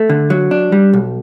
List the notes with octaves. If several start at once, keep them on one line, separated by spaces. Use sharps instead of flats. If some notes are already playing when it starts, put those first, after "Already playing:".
Already playing: A3
D3
F#3
D4
G3
B1